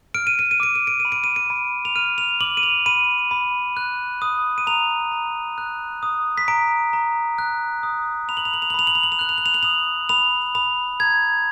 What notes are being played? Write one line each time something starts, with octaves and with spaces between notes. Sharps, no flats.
F6 D7
D#7
D7
D#7
D6 D7
D#7
D7
D#7
B5
D7
D#7
D7
B5
F7
F6 D#7
F7
D6 F#7
D#7
F7
B5 D#7
B5
F#6
D#6
D#7
A#5 F7
A#5
F#6
D#6
B6
A#5 D7
A#5
F#6
D#6
B5 F7
F#7
F7
F#7
F7
F#7
B5 F7
F#7
F7
F#7
F7
F#6 F#7
F7
F#7
F7
F#7
D#6 F7
B5 F7
B5 F7
A#5 G#6